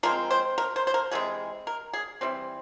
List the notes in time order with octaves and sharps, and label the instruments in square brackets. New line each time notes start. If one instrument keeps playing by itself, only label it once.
[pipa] F3 G#3 C4 A#4
C5
A#4
C5
C5
A#4
C3 E3 G#3 G#4
A#4
G#4
E3 G3 C4